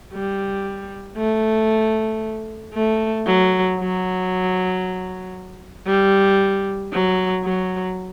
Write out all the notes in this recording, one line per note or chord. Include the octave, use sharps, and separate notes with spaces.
G3
A3
A3
F#3
F#3
G3
F#3
F#3